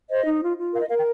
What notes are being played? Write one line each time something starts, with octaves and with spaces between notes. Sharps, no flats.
C5 D#5
D#4
F4
F4
A#4 F5
D#5
A#4 F5
G5